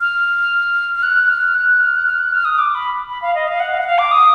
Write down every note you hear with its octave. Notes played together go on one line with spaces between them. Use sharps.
F6
F6
F#6
F6
F#6
F6
F#6
F6
F#6
F6
D#6
D6
B5
B5
F5
D#5
F5
F#5
F5
F#5
F5
D6
D#6